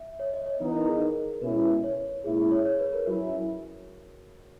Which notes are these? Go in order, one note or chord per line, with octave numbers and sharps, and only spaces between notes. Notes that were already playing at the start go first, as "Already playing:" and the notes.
Already playing: E5
C#5
D#5
C#5
E3 B3 D#4 B4
A#4
G#4
A#4
B2 G#3 C#4 E4 B4
C#5
A#2 G#3 C#4 E4 G#4
G#4
C#5
C#5
B4
A#4
F#3 C#4 E4 F#4